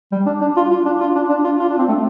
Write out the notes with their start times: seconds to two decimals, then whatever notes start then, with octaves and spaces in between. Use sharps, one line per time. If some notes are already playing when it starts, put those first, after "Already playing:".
0.12 G3
0.26 D4
0.41 D4
0.56 F4
0.71 F4
0.86 D4
1.00 F4
1.15 D4
1.29 D4
1.44 F4
1.59 F4
1.69 D4
1.78 C4
1.88 A3